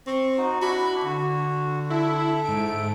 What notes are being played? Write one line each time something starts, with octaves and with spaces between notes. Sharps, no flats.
C4 C#6
D#4 F#4
D4 E4 F#4 B5
D3 F#4
E4 A4 E5
G#2 D7